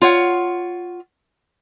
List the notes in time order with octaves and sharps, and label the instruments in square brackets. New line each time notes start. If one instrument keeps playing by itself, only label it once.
[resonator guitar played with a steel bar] F4 C#5 F#5